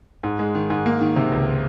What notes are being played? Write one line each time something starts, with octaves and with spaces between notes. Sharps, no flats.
G#2
G#3
D#3
G#2
A#3
D#3
C3
C#2